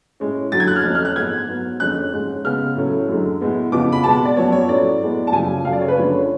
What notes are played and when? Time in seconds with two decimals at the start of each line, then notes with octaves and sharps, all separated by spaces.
0.20 A2 G#3 C#4
0.52 F#2 D3 F#3 A6
0.60 G#6
0.67 F#6
0.76 F6
0.84 F2 F3 A3 C#4
0.95 F6
1.05 F#6
1.16 G#2 G#3 B3 G#6
1.48 G#2 F#3 B3
1.80 F2 D3 G#3 C#4 F#6
2.12 G#2 G#3 C#4
2.44 C#3 G#3 B3 F6
2.76 A2 F#3 A3 C#4
3.08 F#2 D3 G#3
3.41 A2 G#3 B3
3.72 F2 C#3 F3 B3 D6
3.92 B5
4.04 B2 G#3 B3 A5
4.25 D5
4.36 F#2 F3 B3 C#5
4.52 C#5
4.69 A2 F#3 A3 C#4 D5
5.00 A2 G#3 B3
5.27 A5
5.32 F#2 C#3 F3 G#5
5.64 F#2 C#3 F#3 A3 F5
5.73 D5
5.81 C#5
5.88 B4
5.97 F#2 D3 F3 G#3 C#4 C#5